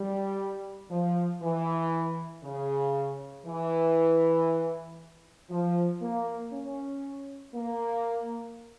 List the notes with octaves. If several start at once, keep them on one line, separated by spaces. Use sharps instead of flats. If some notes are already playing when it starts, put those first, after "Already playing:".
Already playing: G3
F3
E3
C#3
E3
F3
A#3
C#4
A#3